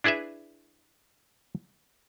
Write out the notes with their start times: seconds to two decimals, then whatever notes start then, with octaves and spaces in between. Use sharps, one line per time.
0.04 D4 E4 G#4 B4 E5